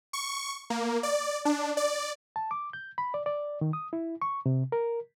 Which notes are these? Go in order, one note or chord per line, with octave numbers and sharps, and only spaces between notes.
C#6
A#3
D5
D4
D5
A5
D6
G6
B5
D5
D5
D#3
D#6
E4
C#6
C3
A#4